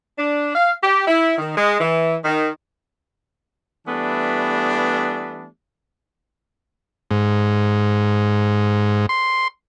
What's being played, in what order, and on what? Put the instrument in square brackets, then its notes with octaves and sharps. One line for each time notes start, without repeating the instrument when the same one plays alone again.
[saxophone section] D4
F5
G4
E4
D#3
G#3
E3
D#3
[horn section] E3 G3 A3 B3 D4
[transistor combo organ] G#2
C6